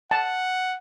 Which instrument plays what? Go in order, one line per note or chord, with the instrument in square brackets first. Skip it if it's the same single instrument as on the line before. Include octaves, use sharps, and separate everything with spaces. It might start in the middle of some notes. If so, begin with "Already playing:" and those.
[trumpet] F#5 [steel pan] A5